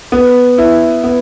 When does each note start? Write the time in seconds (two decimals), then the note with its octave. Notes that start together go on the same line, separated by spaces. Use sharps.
0.12 B3
0.58 E4
1.04 B3